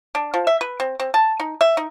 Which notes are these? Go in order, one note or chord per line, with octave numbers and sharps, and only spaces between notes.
D4
F3
E5
B4
C4
C4
A5
D#4
E5
D#4